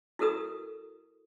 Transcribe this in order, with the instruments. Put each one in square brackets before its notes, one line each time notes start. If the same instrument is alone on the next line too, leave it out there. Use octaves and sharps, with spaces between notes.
[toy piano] E4 F#4 A4 A#4 D#6